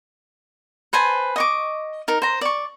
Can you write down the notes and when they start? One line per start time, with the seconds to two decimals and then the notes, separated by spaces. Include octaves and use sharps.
0.93 B4 C5 G#5 A5
1.36 D#5 C#6 D6
2.08 D#4 A#4
2.22 C5 A#5
2.41 D5 C#6